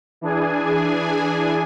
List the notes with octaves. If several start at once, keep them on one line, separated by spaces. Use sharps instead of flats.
E3 D4 G#4 G#5